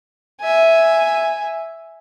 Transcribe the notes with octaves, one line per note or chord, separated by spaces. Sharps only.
E5 G#5